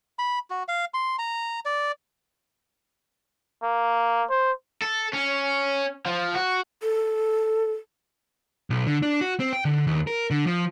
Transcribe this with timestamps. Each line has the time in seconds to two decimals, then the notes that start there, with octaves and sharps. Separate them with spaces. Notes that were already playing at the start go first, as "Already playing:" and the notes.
0.19 B5
0.50 F#4
0.68 F5
0.94 C6
1.19 A#5
1.65 D5
3.63 A#3
4.30 C5
4.82 A4
5.13 C#4
6.06 F3
6.34 F#4
6.83 A4
8.70 B1
8.87 D3
9.03 D4
9.21 F#4
9.40 C4
9.53 G5
9.65 D3
9.87 D#2
10.07 A#4
10.31 D3
10.47 F3